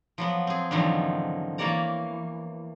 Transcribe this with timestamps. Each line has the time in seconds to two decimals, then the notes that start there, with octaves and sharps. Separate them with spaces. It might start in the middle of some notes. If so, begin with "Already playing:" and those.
0.18 F3 F#3 B3
0.47 C4 G#4
0.71 E2 G#2 D3 D#3 F3 F#3
1.58 E3 A#3 A#4 C#5 D5 A#5